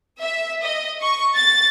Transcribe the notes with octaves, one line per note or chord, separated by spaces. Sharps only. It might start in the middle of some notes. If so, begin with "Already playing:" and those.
E5
D#5
C#6
A6